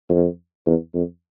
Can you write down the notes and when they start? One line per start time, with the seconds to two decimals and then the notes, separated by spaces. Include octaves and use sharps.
0.09 F2
0.66 E2
0.94 F2